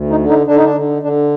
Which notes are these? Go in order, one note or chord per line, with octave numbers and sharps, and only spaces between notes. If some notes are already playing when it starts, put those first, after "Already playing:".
Already playing: D2
D#4
D3
D#4
D3 D4
D#4
D4
D3
D3 D4